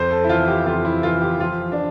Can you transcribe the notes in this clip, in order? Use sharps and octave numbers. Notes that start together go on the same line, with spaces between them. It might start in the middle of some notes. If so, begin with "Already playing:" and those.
Already playing: F2 C5
A4
E4
E3 F4
G4
F2 F4
E4
E3 F4
G4
F3 F4
D4